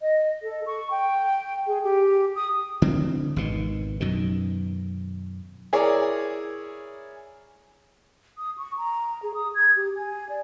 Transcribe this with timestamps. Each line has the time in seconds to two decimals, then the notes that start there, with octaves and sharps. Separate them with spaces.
0.01 D#5
0.43 A4
0.66 C#6
0.91 G5
1.67 G#4
1.84 G4
2.36 D#6
2.82 D3 C4
3.36 G#1 B2 D#3
4.00 F#2 B2 D#3
5.73 E4 G#4 A#4 C#5 D5
8.38 D#6
8.58 C#6
8.78 A#5
9.23 G#4
9.35 D#6
9.55 G#6
9.76 G4
9.96 G#5
10.29 D5